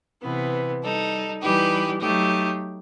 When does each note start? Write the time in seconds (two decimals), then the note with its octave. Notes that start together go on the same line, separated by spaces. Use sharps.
0.23 C3 E3 B3
0.83 G3 D#4 A4
1.42 E3 G3 D#4 G4 B4
2.00 F#3 A3 D#4 G4